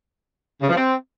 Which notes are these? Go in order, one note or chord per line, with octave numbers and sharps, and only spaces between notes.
C#3
F3
C4